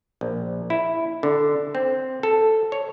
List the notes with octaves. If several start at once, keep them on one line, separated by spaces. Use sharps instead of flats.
A#1
E4
D3
C4
A4
C#5